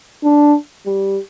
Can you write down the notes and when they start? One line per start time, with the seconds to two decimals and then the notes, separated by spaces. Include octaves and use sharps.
0.24 D4
0.86 G3